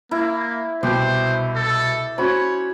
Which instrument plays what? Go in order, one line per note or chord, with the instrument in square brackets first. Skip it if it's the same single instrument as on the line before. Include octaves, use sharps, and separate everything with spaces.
[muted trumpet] A#3 [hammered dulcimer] E4
[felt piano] C2 B2 [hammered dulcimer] G4 [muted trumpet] C5
[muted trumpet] A4
[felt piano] C#4 F#4 C5 [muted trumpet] C#5 [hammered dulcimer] B5